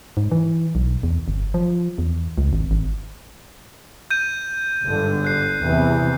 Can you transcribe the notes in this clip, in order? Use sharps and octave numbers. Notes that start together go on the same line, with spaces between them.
G#2
E3
B1
E2
G1
F3
E2
C#2
G#1
G#1
G6 D#7
G1 G#2 D3
F#6 C7
E2 C3 E3